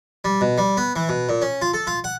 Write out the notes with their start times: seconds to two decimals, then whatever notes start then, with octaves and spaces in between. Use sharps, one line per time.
0.25 G3
0.41 B2
0.58 G3
0.77 B3
0.96 E3
1.09 B2
1.29 A#2
1.42 C#4
1.62 F4
1.73 A4
1.87 F4
2.04 F#5